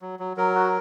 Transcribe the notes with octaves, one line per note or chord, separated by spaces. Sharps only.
F#3
F#3
F#3 A#4
F#4